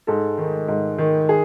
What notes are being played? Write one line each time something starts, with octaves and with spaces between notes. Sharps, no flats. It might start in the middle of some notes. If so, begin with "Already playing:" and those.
G#2 A4
D#3
G#2
D#3
G#4